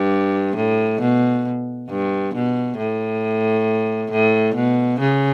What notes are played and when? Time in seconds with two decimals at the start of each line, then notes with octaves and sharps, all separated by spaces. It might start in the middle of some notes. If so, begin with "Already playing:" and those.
Already playing: G2
0.56 A2
1.01 B2
1.89 G2
2.34 B2
2.78 A2
4.11 A2
4.55 B2
5.00 C#3